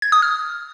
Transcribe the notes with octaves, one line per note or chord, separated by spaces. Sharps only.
G#6
D#6
F6